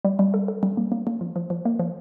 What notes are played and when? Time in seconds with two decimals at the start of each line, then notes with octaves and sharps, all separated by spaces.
0.05 G3
0.19 G3
0.34 A4
0.48 A4
0.63 G3
0.77 A#3
0.92 A#3
1.07 A#3
1.21 F3
1.36 F3
1.50 F3
1.65 A#3
1.80 F3